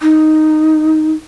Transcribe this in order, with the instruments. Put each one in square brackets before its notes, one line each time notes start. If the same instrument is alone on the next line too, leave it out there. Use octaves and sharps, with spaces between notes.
[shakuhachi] D#4